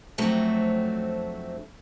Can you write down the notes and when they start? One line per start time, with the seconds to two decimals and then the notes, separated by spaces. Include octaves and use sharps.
0.18 F2 F#3 A3 C4 D4 F#4